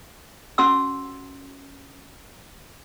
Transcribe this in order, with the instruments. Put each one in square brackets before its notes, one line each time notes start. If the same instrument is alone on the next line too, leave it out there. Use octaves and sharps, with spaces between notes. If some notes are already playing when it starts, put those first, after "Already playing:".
[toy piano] C#4 F#4 F#5 E6